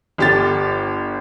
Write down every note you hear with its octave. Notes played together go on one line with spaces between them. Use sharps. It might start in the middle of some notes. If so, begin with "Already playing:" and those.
G1 G4 A6